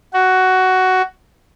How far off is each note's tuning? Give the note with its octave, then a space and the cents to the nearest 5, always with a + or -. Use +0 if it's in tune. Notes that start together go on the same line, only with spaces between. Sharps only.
F#4 +10